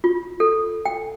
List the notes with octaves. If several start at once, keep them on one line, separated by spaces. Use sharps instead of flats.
F4
A4
G5